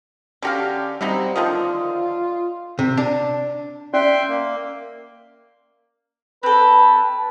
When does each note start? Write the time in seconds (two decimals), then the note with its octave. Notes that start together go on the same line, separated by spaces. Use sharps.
0.42 D3 C#4 F#4 G4 F5
1.01 F#3 G3 C4 D#4 E4
1.36 D3 D#3 F3 F4 D#6
2.79 C3
2.97 D4
3.93 C#4 D5 E5 G5 C6
4.28 A#3
6.43 C4 A4 B4